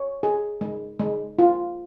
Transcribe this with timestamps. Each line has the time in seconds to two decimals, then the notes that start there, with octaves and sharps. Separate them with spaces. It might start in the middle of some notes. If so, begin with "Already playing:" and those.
Already playing: C#5
0.23 G#4
0.61 G#3
0.99 G#3
1.39 F4